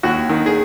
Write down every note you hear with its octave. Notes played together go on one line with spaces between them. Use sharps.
D#2 F#4
D#3
G#4